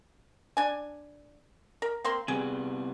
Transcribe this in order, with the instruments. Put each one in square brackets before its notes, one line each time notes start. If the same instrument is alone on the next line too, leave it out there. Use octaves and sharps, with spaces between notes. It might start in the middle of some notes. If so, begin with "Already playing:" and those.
[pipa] D4 G#5
A#4
A#3 C4 C6
[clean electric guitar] C3 G3 B3 [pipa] G#4